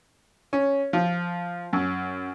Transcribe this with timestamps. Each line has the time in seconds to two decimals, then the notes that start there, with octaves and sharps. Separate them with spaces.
0.53 C#4
0.93 F3
1.73 F#2